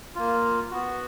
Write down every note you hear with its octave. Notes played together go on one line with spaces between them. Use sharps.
A#3 F4
B3 F#4